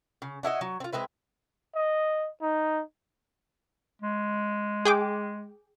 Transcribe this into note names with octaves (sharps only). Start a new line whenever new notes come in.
C#3
D4 E4 F#4 D#5
F#3
C4 F4
G#3 C4 E4 B4
D#5
D#4
G#3
G#4 G5 D6